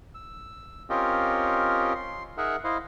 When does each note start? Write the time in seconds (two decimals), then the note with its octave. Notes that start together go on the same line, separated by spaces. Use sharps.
0.15 E6
0.90 C4 C#4 F4 G4 A#4 D#5
1.95 C6
2.38 D#4 G#4 A#4 E5 F#5
2.64 E4 C5 D#5 F5